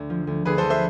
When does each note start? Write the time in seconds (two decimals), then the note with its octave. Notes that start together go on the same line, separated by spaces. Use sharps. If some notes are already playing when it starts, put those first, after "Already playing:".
Already playing: D2 D3
0.10 F3
0.27 D2
0.45 D2 G#4 B4
0.58 A4 C5
0.64 F3
0.70 C5 E5